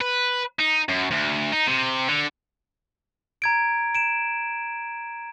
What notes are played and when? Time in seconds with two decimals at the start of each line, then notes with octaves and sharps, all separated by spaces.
0.01 B4
0.59 D#4
0.89 F#2
1.11 D2
1.52 D#4
1.67 C3
2.08 D3
3.42 A#5 G#6 D7
3.95 D7 E7